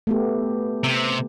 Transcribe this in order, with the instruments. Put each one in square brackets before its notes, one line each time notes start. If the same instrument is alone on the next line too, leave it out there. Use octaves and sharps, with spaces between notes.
[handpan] A3 B3 G4
[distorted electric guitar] C3